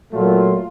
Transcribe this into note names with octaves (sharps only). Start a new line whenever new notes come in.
A#2 F#3 A3 F4